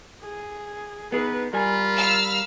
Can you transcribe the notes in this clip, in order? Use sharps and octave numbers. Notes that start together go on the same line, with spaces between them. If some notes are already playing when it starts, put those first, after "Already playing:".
G#4
B3 D#4 G#4 B4
G3 F4 A#4 G#5 B5
F5 E6 F6